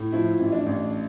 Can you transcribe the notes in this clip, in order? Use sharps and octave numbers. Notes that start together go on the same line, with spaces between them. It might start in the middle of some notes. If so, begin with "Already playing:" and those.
Already playing: A2
F3 E4
A1
D4
A1